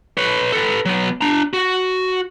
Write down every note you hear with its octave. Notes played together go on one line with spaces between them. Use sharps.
B4 C#5
A4 B4
F#3 B3
D4 A#5
F#4